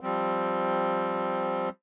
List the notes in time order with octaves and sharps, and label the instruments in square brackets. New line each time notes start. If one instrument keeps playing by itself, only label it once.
[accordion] F3 G3 C4